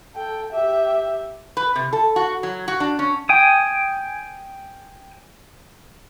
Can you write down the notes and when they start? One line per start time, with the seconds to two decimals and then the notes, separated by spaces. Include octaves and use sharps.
0.15 A4 G5
0.53 G4 E5
1.57 B4
1.76 C3
1.93 A4
2.16 F#4
2.43 F#3
2.68 F#4
2.80 D4
2.99 C#4
3.29 G5 G#5 D#6